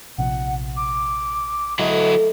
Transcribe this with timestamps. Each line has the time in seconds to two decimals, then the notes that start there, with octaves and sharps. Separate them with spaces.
0.18 A#1 C3 F3 F#5
0.77 D6
1.79 F#3 A3 E4 F4 D#5